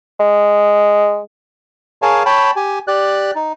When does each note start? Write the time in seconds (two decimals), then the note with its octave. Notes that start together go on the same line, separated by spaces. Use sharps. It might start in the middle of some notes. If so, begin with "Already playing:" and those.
0.20 G#3
2.02 G#4 A#4 C#5 F5 G#5 A5
2.26 C#5 G5 A5 B5
2.56 G4 G#5
2.88 G4 D5 F#6
3.35 D#4